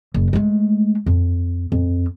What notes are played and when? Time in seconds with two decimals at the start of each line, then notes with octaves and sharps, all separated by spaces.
0.14 F#1
0.33 G#3 A3
1.06 F2
1.72 F2